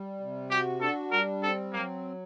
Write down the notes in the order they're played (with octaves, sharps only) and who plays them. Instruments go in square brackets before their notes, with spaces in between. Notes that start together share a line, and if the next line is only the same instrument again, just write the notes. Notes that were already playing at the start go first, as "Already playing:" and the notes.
Already playing: [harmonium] G3
C3
[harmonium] F#4 [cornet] G4
[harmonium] D4 [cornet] A4
[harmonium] G3 [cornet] A#4
[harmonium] C4 [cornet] A4
[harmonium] F#3 [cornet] A#3